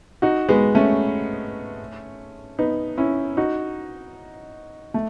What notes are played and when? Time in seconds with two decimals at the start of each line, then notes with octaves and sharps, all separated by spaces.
0.22 D#4 F#4
0.49 G#3 B3
0.75 A3 C#4
2.59 B3 D#4
2.97 C#4 E4
3.37 D#4 F#4
4.94 A3